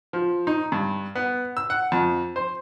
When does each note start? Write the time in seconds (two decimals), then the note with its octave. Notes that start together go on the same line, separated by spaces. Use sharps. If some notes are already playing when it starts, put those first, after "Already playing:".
0.13 F3
0.47 D#4
0.72 G2
1.15 B3
1.57 E6
1.70 F#5
1.92 F2
2.36 C5